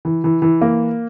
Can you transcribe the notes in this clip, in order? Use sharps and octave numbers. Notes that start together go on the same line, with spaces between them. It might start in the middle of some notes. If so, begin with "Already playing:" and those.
E3
E3
E3
A#3